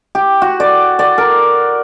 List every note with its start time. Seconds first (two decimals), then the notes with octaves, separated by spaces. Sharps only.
0.15 G4
0.42 F#4
0.60 D5
0.99 D5
1.18 A#4